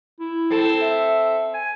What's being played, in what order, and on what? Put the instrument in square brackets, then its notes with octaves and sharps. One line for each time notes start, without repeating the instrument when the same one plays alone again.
[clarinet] E4
[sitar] C4 A4
[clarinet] E5
G#5